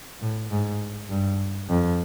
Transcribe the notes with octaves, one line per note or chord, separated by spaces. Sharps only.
A2
G#2
G2
F2